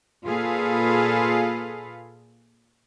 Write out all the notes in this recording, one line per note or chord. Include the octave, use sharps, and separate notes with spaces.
A#2 F4 G#4 A4 B4 F5